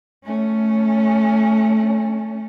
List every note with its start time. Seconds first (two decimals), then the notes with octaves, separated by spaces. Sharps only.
0.25 A3 C#4